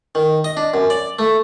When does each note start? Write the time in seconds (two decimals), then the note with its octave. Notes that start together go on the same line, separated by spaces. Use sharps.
0.15 D#3
0.44 D#5
0.57 D4
0.74 F#2
0.90 D5
1.19 A3